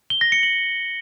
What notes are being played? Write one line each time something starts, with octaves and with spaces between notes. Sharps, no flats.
G7
A#6
C#7
F#7